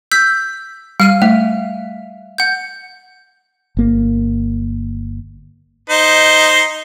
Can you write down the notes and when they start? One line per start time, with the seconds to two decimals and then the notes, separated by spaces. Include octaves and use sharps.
0.12 E6 G6 B6
1.00 G3 F5 F6 D#7
1.22 A3 E5
2.38 F#5 G6
3.77 G1 A#3
5.90 D#4 C5